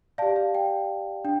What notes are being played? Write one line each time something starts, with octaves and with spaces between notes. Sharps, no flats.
G4 D5 F5 A5
F5
G5
D4 G5